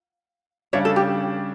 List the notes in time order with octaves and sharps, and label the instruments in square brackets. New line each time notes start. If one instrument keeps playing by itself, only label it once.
[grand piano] C#3 G3 D4 [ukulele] C#5 E5
[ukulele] A4
G4